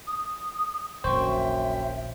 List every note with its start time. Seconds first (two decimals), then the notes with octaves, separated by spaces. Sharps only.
0.07 D#6
1.04 D#1 A#1 F#2 C5 G5 C#6
1.28 E5